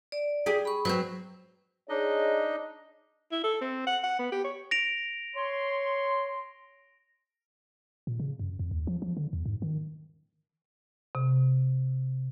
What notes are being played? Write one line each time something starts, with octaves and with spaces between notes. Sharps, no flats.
D5
G4 G#4
B5 C#6
F#3 C4 B4 C5
D4 D#4 G#4 C#5 D#5
E4
A4
C4
F#5
F#5
B3
G4
C#5
A#6 D7 F7
C#5 C6
A#2
C#3
F#2
F2
D#2
F3
F3
D3
E2
G#2
D#3
C3